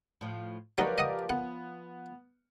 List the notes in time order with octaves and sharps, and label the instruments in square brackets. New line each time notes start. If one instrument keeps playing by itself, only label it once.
[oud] A2 F3
[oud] F3 B4 C#5 [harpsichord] F#3 D#4 [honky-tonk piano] G4 A#4 D5
[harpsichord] D#5 F#5 D#6
[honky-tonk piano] B3 [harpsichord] F#5